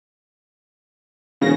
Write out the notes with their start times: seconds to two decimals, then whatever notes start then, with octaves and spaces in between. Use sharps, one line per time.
1.41 E1 C#3 A#6